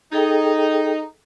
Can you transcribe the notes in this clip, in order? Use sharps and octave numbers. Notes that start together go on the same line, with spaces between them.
D#4 G#4 A4 G5